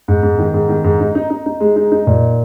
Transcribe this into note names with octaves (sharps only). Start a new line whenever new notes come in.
G#2
G#2
D#3
G#2
D#3
G#2
D#4
D#4
D#4
D#4
G#3
D#4
D#4
A#2